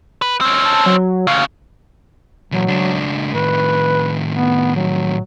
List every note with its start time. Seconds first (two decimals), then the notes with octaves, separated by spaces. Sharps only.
0.22 B4
0.41 C4 C#4
0.65 A5
0.86 F#3
1.27 D2 C#3 F5
2.52 A#2 E3 F#3
2.67 C#2 D4
3.34 A2 D#3 B4
4.35 B3
4.75 F#3